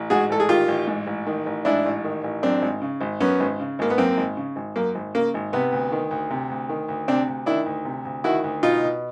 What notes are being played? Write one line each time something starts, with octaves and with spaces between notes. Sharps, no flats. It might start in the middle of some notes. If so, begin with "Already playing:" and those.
Already playing: A1
G#2 F#4 G#4
A1 A4
G#4
D#3 F4 G4
A1
G#2
A1
D#3
A1
G#2 D4 E4
A1
D#3
A1
F#2 C4 D4
G#1
C#3
G#1
F#2 B3 C#4
G#1
C#3
G#1 A#3
B3
F#2 A#3 C4
G#1
C#3
G#1
F#2 A#3
G#1
C#3 A#3
G#1
C3 B3
D2
D#3
D2
C3
D2
D#3
D2
C3 C4 D4
D2
D#3 D4 E4
D2
C3
D2
D#3 E4 F#4
D2
B2 D#4 F4
B2